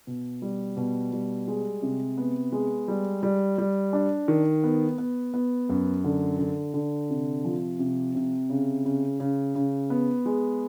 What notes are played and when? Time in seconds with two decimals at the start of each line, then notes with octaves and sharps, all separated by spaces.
0.07 B2
0.42 G3
0.77 B2
1.12 G3
1.48 G#3
1.82 C3
2.18 B3
2.52 G#3
2.88 G3
3.23 G3
3.58 G3
3.93 D4
4.28 D#3
4.64 B3
4.98 B3
5.34 B3
5.69 F#2
6.04 D3
6.39 D3
6.74 D3
7.10 C3
7.45 F3
7.79 C3
8.15 C3
8.50 C#3
8.85 C#3
9.20 C#3
9.55 C#3
9.90 B3
10.26 G#3